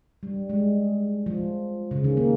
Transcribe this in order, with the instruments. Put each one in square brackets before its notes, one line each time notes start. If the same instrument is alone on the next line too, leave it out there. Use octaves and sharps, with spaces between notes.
[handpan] G3
G#3
F3
C#3
D#3
A#3